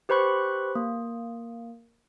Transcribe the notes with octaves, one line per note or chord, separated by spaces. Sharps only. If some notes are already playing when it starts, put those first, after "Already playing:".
G4 B4 C5 B5 C#6 F#6
A#3